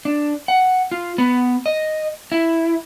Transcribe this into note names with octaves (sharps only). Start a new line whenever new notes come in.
D4
F#5
F4
B3
D#5
E4